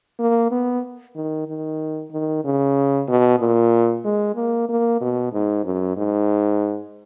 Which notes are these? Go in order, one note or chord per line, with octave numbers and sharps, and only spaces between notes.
A#3
B3
D#3
D#3
D#3
C#3
B2
A#2
G#3
A#3
A#3
B2
G#2
F#2
G#2